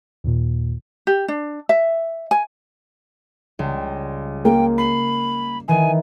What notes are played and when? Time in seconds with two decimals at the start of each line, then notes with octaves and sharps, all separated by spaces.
0.24 D#2 A#2
1.07 G4
1.28 D4
1.69 E5
2.31 G#5
3.59 C#2 G3
4.45 A#3 G5
4.78 B5 C7
5.68 D#3 E3 G#5